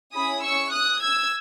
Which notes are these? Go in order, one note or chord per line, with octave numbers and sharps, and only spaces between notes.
C#4 E4 G#4 B5 D#6
C#6 E6
D#6 F#6
E6 G#6